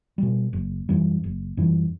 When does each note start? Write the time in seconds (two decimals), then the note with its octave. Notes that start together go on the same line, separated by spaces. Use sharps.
0.18 B2 G3
0.53 F#1
0.89 F#2 E3 G3
1.24 F#1
1.57 F#2 E3 G3